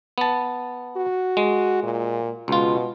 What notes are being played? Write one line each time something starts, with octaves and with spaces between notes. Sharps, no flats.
B3 A5
F#4
G#3
A#2
C#2 B2 F4